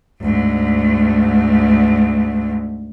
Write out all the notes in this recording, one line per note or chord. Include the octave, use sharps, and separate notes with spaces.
D2 G#2